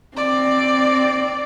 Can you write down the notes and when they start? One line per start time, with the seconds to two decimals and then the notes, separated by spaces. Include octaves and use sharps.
0.17 C4 D5